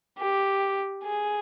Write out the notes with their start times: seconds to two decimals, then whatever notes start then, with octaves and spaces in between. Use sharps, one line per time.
0.19 G4
1.04 G#4